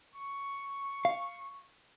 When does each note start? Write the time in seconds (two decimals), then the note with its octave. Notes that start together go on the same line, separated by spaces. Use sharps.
0.15 C#6
1.05 F5